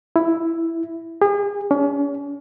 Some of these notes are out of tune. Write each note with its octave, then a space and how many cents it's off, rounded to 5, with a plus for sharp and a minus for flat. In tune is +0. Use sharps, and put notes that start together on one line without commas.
E4 +5
G#4 -40
C#4 +40